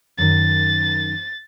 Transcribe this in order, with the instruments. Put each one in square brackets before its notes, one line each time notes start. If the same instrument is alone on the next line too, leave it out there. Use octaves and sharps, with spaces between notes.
[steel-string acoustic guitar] F#2 D#3 [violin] A6